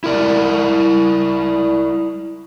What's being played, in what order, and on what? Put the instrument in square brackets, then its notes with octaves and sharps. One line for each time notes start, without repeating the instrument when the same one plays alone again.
[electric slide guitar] E4 A#4 D5